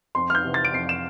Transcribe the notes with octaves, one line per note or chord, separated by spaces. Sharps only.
F2 C6
F6
G6
C3 E3
A6
D7
F2 C7
E7